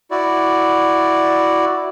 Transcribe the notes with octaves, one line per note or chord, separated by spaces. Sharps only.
E4 F#4 D5